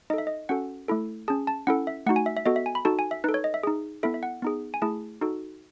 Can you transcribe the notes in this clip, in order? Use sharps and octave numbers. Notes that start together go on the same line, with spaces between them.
D#4 A4 D#5 E5
D#5
C#4 F#4 A4 F#5
A3 E4 A4
C#4 G#4 A5
A5
C#4 E4 A4 F#5
E5
A3 D#4 F#4 F#5
G#5
E5
E5
B3 F#4 A4 D#5
E5
G#5
B5
D#4 F#4 A4 A5
G#5
E5
D#4 A4 B4
C#5
D#5
E5
D#4 G#4
B3 E4 A4 E5
E5
F#5
B3 D#4 G#4
G#5
A3 E4 G#4 A5
D#4 F#4 A4